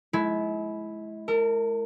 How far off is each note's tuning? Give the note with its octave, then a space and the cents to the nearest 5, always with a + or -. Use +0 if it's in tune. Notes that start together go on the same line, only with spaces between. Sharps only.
G#3 +45 E4 +0
A#4 -25 A5 +25